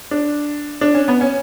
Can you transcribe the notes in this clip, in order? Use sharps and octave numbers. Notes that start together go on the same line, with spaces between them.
D4
D4
C#4
B3
C#4